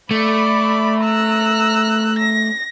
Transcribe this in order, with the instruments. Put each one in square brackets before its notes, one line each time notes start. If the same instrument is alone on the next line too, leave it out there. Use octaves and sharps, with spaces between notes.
[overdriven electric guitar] A3 [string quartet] D5 B5
[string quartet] A#5 E6 F#6
A#6